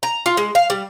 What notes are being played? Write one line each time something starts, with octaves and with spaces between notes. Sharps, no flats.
A#5
F4
G#3
F5
G3